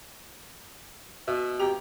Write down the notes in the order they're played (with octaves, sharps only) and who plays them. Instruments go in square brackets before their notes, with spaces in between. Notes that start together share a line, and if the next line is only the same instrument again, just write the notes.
[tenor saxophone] B2 [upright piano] E5 E6
[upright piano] G#1 A#5 F7 [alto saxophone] G4